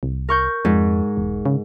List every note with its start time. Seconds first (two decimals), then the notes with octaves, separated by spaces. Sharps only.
0.03 C2
0.29 A#4 C#6 G6
0.65 F2 G#2
1.17 E1
1.46 C#3